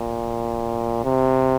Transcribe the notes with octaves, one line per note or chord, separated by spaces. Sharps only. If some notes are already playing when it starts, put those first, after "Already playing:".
Already playing: A#2
C3